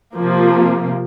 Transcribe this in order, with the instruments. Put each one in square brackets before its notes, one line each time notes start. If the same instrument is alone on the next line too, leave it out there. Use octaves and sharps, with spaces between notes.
[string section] C3 F3 A#3